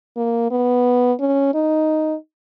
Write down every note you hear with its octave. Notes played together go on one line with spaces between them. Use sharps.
A#3
B3
C#4
D#4